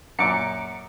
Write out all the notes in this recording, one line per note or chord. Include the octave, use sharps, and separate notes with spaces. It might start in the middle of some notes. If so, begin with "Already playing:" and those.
F#2 A#2 D6 C#7